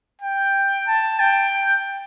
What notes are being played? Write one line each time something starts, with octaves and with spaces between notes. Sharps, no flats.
G5
A5
G5